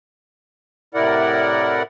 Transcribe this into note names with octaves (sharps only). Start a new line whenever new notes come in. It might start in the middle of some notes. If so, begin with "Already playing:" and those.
A2 C3 E4 A#4 D5 F#5